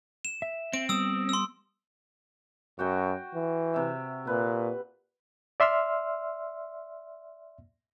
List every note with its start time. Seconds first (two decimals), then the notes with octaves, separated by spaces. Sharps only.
0.25 E7
0.42 E5
0.73 C4 D7
0.89 G3 B3 D#6 E6
1.29 C6 E6
2.79 F#2 F#4 G5 C#6
3.35 E3
3.74 C3 E5
4.27 A#2 B4
5.60 D5 E5 C6 E6 F6